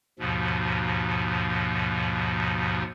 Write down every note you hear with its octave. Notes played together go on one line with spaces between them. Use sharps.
D#2 G#2 B2 F3